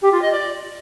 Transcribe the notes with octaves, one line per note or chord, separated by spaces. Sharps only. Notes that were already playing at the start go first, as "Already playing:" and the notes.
G4
F4
D#5
D5